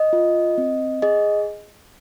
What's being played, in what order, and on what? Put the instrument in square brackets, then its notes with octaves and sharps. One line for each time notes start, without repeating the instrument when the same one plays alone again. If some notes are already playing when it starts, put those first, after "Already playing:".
Already playing: [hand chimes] D#5
F4
C4
G#4 D#5